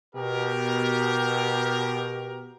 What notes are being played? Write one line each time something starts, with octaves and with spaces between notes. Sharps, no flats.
B2 G4 A#4